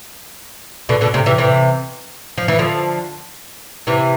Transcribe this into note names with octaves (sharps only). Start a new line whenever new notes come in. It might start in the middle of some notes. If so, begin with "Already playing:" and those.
B2 D3
B2 D3
C3
C3 E3
C3 E3
F3
E3
D3 F3
C3 E3